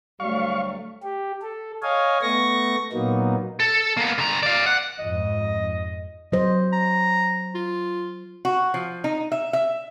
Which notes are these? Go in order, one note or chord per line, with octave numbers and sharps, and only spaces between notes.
D2 F#3 G3 A3 F5 C#6
G4
A4
C#5 D#5 F5 G#5
A3 B3 C#6 A#6
A#2 F#3 A#3 B3 D#4
A4
A#3 B3
D3 A#5
D5 F5
F#5
F2 G#2 D#5
F#3 C5 D#5
A#5
F4
F#4
F3
D#4
E5
E5